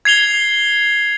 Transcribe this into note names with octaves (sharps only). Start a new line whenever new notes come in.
G#6 C7 F7 G7